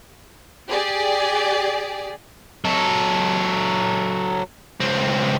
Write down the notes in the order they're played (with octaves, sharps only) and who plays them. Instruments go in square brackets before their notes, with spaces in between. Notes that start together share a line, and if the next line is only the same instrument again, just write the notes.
[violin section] G4 G#4 D5
[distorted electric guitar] F#3 A4
C#2 C4